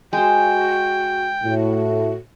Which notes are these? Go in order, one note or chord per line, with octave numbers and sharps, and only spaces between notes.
G#3 F#4 C5 G5
A2 F#4